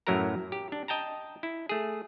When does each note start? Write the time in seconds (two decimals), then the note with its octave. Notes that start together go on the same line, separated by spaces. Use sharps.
0.07 F#2 A2 F#3 E4 A#4 A#5
0.52 G4
0.72 D4
0.88 D#5 G5 A5 A#5
1.43 E4
1.69 A3 G#4